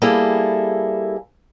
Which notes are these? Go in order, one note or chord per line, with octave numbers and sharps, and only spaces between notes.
G3 A#3 E4 G#4 A4